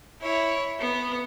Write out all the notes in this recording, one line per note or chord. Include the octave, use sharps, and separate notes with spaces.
E4 C#5
B3